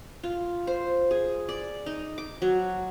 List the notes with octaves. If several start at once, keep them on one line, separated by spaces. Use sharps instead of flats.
F4
C5
G#4
D5
D#4
D6
F#3